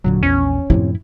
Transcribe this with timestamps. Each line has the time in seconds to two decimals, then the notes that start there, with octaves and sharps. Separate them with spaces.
0.04 E1 A#2 D3 F#3
0.23 A#1 E2 C#4
0.70 F#2 A2 C3 F3 E4